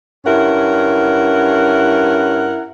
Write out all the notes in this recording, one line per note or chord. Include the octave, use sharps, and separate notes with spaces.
G2 C#4 E4 A#4 F#5